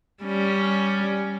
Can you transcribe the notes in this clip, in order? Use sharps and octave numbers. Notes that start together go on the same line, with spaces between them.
G3 C#4